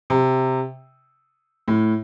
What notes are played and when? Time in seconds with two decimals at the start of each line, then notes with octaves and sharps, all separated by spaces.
0.10 C3
1.68 A2